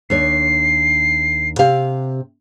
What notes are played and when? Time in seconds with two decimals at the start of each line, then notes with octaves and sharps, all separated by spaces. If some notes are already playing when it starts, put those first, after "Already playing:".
0.10 D#2 D4 C#5 C7
1.59 C3 G4 F5